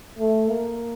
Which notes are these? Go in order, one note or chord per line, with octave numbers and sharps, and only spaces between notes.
A3
A#3